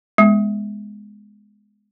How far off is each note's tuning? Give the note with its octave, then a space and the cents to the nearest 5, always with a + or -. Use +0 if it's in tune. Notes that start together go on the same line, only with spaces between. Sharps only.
G#3 +0 B3 +0